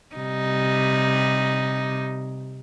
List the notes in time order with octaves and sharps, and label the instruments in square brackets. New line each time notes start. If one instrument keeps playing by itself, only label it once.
[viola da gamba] C3 G3 D#4